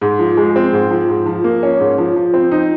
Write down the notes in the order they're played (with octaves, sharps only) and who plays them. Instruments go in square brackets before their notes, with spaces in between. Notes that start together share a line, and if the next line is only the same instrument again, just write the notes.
[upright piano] G#2
F3
G#3
C4
G#2
F3
G#2
F3
A#3
C#4
G#2
F3
F3
C4
D#4